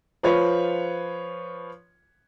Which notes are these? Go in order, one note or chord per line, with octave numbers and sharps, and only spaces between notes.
F3 F4 B4 C#5